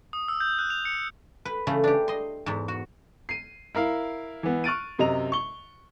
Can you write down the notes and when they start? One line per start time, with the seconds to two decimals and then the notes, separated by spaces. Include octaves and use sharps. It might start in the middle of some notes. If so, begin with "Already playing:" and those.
0.13 D#6
0.28 E6
0.40 G6
0.59 F#6
0.70 F7
0.85 C#7
1.45 B4
1.67 C#3 E3 A3
1.84 D4 G4
2.08 D#5 C6
2.46 E2 G#2
2.68 F#4
3.29 C7 D#7
3.75 E4 A#4 F5
4.43 E3 B3
4.64 C#6 F6 F#6 A6 D7 D#7
4.98 F#2 C3 D#5 A#5 F7
5.32 C#6 G7